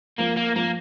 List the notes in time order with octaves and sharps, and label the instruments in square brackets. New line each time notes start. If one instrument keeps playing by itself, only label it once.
[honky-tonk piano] F3 [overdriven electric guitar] A#3
[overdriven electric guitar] A#3
[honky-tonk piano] F3 [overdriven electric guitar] A#3